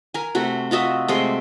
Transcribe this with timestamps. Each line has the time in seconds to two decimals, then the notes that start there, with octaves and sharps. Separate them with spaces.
0.14 A#4 G#5
0.35 C3 A3 F#4
0.71 F4 F#4 D#5 E5
1.08 C3 G#3 A3 C6